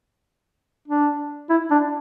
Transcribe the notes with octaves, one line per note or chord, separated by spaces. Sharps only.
D4
E4
D4